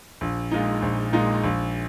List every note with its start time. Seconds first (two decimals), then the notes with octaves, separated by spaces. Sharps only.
0.21 A#1
0.52 A#2 G#3 D#4
0.82 A#1
1.13 A#2 G#3 D#4
1.43 A#1